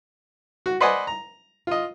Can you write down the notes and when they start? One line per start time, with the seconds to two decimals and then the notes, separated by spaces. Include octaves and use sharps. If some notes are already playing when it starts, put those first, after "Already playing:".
0.66 F#4
0.81 B4 C5 D5 D#5 F#5 G#5
1.07 A#5
1.67 F4 D#5